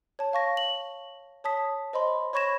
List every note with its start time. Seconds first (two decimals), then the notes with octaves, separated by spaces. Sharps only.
0.19 C#5 A5
0.33 F5 C#6 A#6
0.57 F#7
1.44 C#5 A5 D#6 B6
1.93 C5 D#5 B5 C6
2.33 C#5 B5 C#6 G#6 A#6 E7